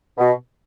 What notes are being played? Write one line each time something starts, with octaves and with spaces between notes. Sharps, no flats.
B2